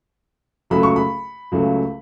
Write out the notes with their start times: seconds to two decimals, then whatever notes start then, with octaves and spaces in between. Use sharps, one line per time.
0.70 C#2 C#3 F#3 A3 B5
0.83 C#6
0.96 B5
1.52 C#2 C#3 F#3 A3